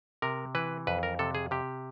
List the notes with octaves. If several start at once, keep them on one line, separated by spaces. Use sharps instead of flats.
C3 A#4
E3 B4
F2 B4
A#4
C3 A4
G#4
C3 G4